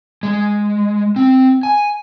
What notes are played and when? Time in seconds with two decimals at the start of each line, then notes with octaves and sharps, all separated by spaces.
0.23 G#3
1.16 C4
1.63 G#5